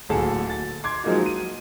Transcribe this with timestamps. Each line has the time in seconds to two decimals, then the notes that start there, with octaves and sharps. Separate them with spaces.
0.09 D1 D2 A#2 G#4 A4 A5
0.50 A6
0.84 C6 D6 G#6
1.04 F3 F#3 G#3 A#3 D#4 F#4
1.26 D#7